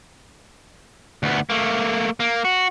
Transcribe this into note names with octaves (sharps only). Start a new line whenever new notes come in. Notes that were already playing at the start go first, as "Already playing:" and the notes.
D2 B3
A3 A#3
A#3
F#4